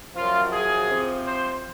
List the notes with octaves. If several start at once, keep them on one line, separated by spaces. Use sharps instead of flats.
F#2 F3 F4
G#4
C3 F3
C5